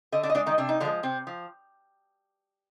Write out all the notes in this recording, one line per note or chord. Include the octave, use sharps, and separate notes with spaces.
D3 D#5
D4 D5
D#5
G#3 D4 D5
D#3 D#4
C3 D4
D#4
D3 F3 G#3 D4
C3 C4
F3